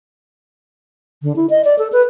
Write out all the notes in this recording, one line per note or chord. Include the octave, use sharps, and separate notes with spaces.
D3
E4
D#5
D5
A4
B4